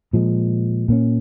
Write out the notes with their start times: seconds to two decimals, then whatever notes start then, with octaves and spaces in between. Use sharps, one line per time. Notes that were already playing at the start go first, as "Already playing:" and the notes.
0.13 A#2 F3 G#3
0.88 A#2 A#3 C#4